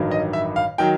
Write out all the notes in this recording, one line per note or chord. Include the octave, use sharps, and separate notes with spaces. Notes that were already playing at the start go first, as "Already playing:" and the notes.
Already playing: A1 G2 D#3 F#3
D#5
E5
F5
D#3 F#3 G5